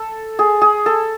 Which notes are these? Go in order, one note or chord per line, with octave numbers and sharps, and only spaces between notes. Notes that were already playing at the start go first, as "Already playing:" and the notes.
Already playing: A4
G#4
G#4
A4